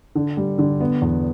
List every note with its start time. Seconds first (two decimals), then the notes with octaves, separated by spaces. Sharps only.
0.15 D3
0.37 G3
0.59 D3
0.81 B3
1.02 E2